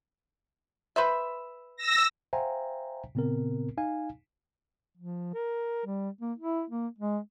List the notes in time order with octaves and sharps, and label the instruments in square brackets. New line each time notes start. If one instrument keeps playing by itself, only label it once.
[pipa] B4 C5 E5
[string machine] E6 A#6
[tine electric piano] C5 E5 F5 G5 G#5 A#5
A#2 C#3 B3 C4 A#4
D#4 F5 G#5
[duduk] F3
A#4
G3
A#3
E4
A#3
G#3